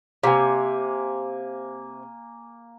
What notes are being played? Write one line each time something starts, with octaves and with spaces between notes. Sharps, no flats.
C3 A#3 G#5